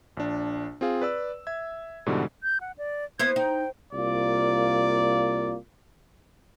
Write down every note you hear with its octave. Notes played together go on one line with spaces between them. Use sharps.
A#1 D4
C4 F4 G#4 F5
B4 D5 E6
E5 G#6
G#2 B2 D3 E3 G3
G6
F#5
D5
B3 E4 C5 G#6
D#4 G5
C2 A#3 F4 D5